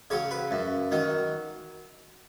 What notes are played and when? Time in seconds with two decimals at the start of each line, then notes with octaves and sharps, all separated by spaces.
0.10 C#3 F#3 C#5
0.31 B4
0.51 F#2
0.92 D#3 F#3